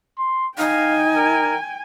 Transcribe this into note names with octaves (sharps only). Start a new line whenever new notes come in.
C6
D#4 F5 G5 G#5
A#4